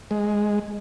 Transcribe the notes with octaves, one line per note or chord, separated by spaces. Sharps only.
G#3